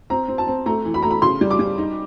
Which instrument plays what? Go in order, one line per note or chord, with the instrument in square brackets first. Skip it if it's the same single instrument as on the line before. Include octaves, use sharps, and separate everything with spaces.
[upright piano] C4 A#5
C4
A5
C4
A3 A#5
E3
B5
A3 A#5
B5
C#3 C6
G3
D6
G3
D#4